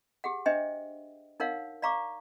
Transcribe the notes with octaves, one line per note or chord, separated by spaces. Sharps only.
G4 G#4 F#5
D4 C5 D#5 E5 G5
D#4 A#4 C#5 F5 F#5
D5 F5 A#5 C#6 D6